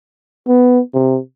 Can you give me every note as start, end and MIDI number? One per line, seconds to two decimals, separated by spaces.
0.48 0.80 59
0.94 1.19 48